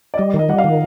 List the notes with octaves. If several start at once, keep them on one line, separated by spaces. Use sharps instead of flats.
D5
G3 D#5
D#3
D#5
G3 F#5
F5
D#3